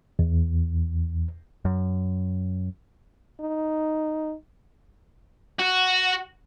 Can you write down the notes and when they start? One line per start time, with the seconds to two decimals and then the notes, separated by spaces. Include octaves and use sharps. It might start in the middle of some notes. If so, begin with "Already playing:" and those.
0.19 E2
1.65 F#2
3.40 D#4
5.59 F#4